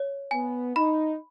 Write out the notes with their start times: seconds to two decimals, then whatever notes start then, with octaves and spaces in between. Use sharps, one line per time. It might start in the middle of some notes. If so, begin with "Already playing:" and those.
Already playing: C#5
0.31 B3 G#5
0.75 D#4 B5